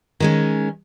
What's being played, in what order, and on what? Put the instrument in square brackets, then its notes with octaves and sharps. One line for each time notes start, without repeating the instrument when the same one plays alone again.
[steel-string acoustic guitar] D#3 G#3 C#4